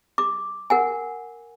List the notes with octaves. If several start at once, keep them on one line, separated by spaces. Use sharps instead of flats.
D6
A#4 F#5 G#5